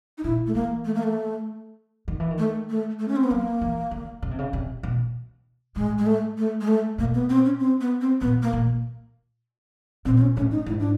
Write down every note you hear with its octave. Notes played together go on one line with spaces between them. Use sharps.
D#4
A#2 E4
A3
E3 A#3
A3
A#3
A3
D#3
E3
D#3
A3
A3
A3
C#4
C4
B3
F#3 A#3
E3
D3
C#3
C3
C#3
C3
B2
A2 G#3
G#3
A3
A3
G#3
A3
B2 A#3
B3
C4
C#4
C4
B3
C4
A#2 B3
A#3
A#2
A#2 C4
C4
C#4
A2 C#4
D#4
G#2 E4
D4